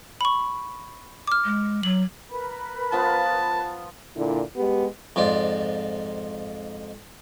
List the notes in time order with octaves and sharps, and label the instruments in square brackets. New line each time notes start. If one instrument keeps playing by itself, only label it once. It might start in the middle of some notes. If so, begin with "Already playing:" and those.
[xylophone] B5 C#6
D6 F6
[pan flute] G#3
[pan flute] F#3 [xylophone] F#7
[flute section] A#4 B4 B5
[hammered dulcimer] F3 B3 F4 [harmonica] A5
[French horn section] A#2 D3 E4
G#3 B3 G4
[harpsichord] F2 G#2 F4 D5